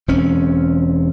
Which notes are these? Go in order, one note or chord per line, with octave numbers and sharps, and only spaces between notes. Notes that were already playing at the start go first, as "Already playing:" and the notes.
E1 C4 C#4